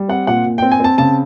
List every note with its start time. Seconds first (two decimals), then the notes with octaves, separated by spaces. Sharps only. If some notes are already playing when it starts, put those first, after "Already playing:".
Already playing: G3
0.09 C4 F#5
0.27 A#2 F#5
0.45 A#2
0.58 C4 G5
0.72 G#5
0.80 C4 A5
0.98 C#3 A5